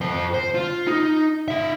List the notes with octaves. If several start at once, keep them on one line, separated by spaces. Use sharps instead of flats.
F2 C5
C5
F4
D#4
D#4 E5